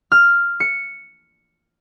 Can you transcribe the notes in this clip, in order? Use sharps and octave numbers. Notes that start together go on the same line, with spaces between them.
F6
C#7